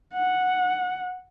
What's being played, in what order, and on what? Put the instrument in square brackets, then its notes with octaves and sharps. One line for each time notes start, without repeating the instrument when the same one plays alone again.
[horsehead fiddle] F#5